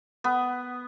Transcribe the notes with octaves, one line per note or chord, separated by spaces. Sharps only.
B3